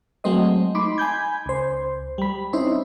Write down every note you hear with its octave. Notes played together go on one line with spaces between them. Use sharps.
F#3 G#3 A3 C4 C5 D#5
D#4 B5 C6 D6
G#5 B5 G6 G#6
C#2 C5
G3 B5
C4 C#4 D#4 E4 C5